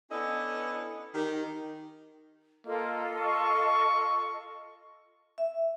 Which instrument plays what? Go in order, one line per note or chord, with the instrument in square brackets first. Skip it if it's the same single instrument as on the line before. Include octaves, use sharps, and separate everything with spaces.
[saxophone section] B3 C#4 D4 E4 A4 D#5
D#3 G4
[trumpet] A#3 [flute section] F4 A4 D#5
[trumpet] C#6
[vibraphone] E5